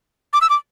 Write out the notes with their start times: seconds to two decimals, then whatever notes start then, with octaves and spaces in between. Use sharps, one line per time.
0.33 D6
0.41 E6
0.50 D6